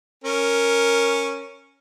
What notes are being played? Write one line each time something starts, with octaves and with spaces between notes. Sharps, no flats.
C#4 A#4